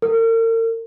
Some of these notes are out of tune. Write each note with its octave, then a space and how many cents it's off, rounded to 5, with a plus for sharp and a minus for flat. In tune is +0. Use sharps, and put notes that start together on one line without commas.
A#4 -40